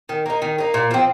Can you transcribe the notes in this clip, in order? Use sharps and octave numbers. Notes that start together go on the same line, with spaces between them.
D#3
A#3 D#4
D#3
A#3 D#4
A#2
F3 C4